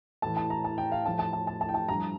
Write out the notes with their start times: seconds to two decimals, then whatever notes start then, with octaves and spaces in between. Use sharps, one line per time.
0.22 A2 E3 A5
0.37 A5
0.50 A#5
0.64 A5
0.78 G5
0.92 F5
1.05 A2 F3 A5
1.19 A5
1.33 A5
1.47 A5
1.61 A5
1.69 G5
1.74 A5
1.88 G2 F3 A#5